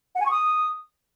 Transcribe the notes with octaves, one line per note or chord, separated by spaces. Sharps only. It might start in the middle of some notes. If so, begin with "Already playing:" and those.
F#5
G#5
C#6
D#6